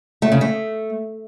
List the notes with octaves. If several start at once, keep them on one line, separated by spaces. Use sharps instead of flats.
A3
C#3
A3